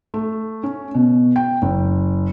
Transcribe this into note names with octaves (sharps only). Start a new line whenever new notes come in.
A3
C#4
B2
G5
F#1